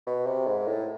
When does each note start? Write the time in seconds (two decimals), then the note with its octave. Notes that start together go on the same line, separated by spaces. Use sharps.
0.07 B2
0.26 C3
0.47 G#2
0.67 A2